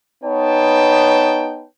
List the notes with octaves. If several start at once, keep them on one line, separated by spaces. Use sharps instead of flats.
B3 D#4 B4 C#5 G5 A5